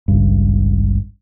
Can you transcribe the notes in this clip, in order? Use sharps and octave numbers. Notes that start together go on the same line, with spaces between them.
G#1 C#2 G2